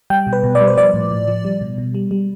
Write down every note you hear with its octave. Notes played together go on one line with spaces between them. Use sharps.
G3 G5
B2
B4
B2
D5
G3
C5
F3 D5
A2
A2
F3
G3
B2
B2
G3
G3